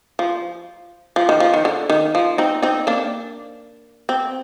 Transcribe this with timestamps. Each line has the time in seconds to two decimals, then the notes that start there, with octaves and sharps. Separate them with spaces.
0.19 F3
1.16 F3
1.29 D#3
1.40 F3
1.54 D#3
1.65 D3
1.90 D#3
2.15 F3
2.38 C4 D#4
2.63 C4 D#4
2.87 A#3 D4
4.09 C4